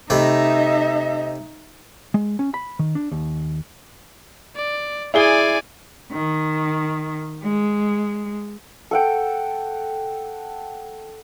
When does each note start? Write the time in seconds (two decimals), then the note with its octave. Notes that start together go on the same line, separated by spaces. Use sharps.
0.10 C3 A3 D#4 D#5 E5 B5
2.14 G#3
2.39 C#4
2.54 B5
2.79 D#3
2.95 D4
3.12 D#2
4.56 D5
5.14 E4 G#4 D5 G#5 G7
6.11 D#3
7.43 G#3
8.91 A4 F#5 G5